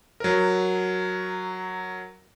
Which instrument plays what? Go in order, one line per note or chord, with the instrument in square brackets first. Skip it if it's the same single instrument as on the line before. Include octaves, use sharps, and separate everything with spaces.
[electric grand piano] F#3 A#4